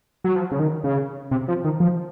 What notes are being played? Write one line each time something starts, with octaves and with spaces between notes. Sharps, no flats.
F#3
F3
C#3
D#3
C#3
C3
F3
D#3
F3